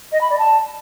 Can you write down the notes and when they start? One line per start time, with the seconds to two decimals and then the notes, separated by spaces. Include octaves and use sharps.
0.12 D#5
0.21 B5
0.30 D5
0.39 A5